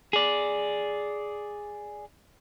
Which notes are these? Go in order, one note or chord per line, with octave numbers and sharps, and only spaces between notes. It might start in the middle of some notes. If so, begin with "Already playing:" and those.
G#4 D5